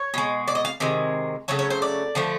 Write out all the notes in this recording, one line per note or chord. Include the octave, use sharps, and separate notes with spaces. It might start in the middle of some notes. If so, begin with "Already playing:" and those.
Already playing: C#5
B2 G#3
D5
D#5
F5
C3 D#3 G#3
C#3 F#3 A3 C#5
C#5
C5
D5
D3 F3 A3